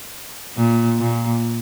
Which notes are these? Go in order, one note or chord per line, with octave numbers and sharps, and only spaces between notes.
A#2
A#2